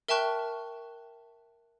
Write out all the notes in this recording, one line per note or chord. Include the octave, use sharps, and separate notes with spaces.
A#4 E5 G5 A5 C#6 F#6